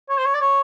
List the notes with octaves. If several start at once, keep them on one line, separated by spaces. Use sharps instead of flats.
C#5
C5
C#5
D5
C#5